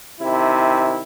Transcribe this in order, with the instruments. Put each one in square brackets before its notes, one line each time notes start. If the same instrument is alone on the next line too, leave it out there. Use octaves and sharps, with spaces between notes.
[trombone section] C3 D#3 E4